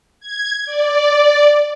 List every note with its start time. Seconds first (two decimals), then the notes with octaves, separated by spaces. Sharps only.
0.20 G#6
0.65 D5